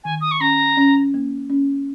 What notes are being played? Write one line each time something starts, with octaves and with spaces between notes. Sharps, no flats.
D#3 G#5
D#6
C#6
C#4 A#5
C#4
A#3
C#4